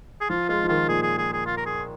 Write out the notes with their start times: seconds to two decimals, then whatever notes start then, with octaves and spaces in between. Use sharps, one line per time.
0.21 G#4
0.30 F3 F4
0.49 G#3 F4
0.64 F3
0.68 D#3 F4
0.88 A#2 G#4
1.02 G#4
1.18 G#4
1.33 G#4
1.46 F4
1.57 A#4
1.66 G#4